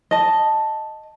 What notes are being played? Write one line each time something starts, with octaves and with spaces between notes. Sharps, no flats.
D#5 A5